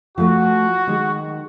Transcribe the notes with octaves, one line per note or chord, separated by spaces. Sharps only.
F3 A3 F#4
D#3 G#3